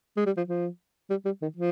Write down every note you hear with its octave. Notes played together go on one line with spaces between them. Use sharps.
G#3
G3
F3
F3
G3
G3
D#3
F3